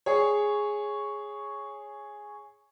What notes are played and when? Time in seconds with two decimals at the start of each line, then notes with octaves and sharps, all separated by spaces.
0.06 G#4 C#5